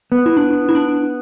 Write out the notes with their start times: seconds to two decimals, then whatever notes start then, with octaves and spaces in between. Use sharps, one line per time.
0.12 B3
0.26 E4
0.37 D4
0.69 E4
0.75 D4